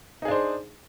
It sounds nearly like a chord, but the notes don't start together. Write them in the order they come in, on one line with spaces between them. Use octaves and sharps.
D#4 G#4 D4 C5